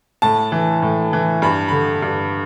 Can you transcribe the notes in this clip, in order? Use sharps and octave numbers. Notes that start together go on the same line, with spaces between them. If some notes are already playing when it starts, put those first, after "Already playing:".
A2 A5
E3
A2
E3
G2 B5
D3 B5
G2